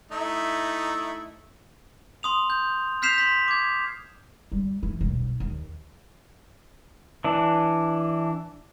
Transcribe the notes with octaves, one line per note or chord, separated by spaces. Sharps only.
A3 D#4 E4
C6 D#6 F7
G6
F6 G6 B6 C7 E7 F7
C6 B6
D6 G#6
G3
E3
D#1 B1
D#2
E3 D4